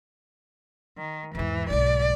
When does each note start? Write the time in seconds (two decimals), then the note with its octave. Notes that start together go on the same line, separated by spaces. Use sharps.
0.98 D#3
1.35 E2 G#2 E3
1.70 B1 G#2 D5